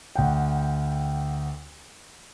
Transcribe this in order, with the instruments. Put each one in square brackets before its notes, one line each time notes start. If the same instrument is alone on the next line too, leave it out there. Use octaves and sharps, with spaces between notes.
[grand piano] D2 F#5 G5